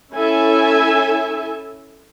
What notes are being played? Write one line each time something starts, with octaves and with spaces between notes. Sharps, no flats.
C#4 E4 A4 E5 G#5